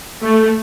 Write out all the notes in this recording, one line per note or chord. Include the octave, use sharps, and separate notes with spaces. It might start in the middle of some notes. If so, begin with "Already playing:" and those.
A3